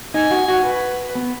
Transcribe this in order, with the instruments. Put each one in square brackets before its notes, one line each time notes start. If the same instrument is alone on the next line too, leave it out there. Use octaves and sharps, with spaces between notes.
[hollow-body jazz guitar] D#4 [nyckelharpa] G#5
[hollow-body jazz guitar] F#4
F#4
[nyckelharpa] B4
[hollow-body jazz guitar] B3